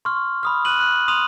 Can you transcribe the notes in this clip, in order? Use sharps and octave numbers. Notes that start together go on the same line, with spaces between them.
C6 C#6 F6
B5 D#6 F6
F#6 D#7 F#7
F#6
C6 D#6 D#7 F7 F#7